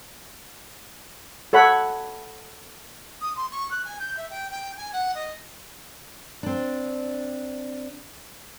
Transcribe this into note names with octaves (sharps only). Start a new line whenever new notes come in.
A4 C#5 F#5 B5
D#6
C6
C#6
F#6
G#5
G6
E5
G5
G5
G#5
F#5
D#5
C4 D4